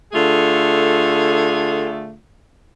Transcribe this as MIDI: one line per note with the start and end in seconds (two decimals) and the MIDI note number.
0.13 2.13 50
0.13 2.13 57
0.13 2.13 65
0.13 2.13 68